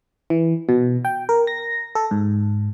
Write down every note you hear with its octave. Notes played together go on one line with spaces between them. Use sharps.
E3
B2
G5
A#4
A#6
A4
G#2